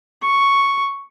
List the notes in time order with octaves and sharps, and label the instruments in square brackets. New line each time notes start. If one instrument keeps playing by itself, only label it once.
[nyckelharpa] C#6